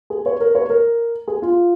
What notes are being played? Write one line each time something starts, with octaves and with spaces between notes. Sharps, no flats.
G#4
C#5
A#4
C#5
A#4
G#4
F4